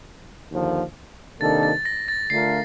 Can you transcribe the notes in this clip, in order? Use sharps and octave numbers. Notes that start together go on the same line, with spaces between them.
D#2 D3 F3
C3 D#3 A#3 D4 A4 A6
A6
A#6
A6
D3 A3 D4 F4 A#4 C7